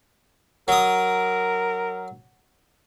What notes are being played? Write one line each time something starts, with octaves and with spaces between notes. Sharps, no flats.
F#3 A#4 D#6